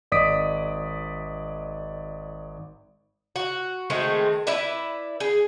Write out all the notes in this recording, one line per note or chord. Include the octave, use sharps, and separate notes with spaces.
G#1 D5 D#5 D#6 B6 D7
F#4
D#3 G#3 A3 C4
E4 B4 D5 E5
G#4